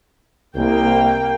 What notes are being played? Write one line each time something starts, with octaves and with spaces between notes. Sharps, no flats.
C2 A#3 G5